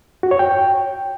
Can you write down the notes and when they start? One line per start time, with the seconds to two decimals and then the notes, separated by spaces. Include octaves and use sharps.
0.23 F#4
0.31 C#5
0.39 G5